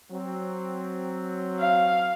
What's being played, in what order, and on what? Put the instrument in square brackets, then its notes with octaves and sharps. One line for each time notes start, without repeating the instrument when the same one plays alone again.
[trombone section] F#3 C4
[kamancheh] F5